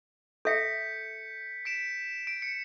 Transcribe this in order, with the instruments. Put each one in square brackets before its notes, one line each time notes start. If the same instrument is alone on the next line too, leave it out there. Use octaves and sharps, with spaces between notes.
[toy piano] A4 E5 [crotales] G6 B6 C#7
[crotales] B6 D7 E7
D7
C#7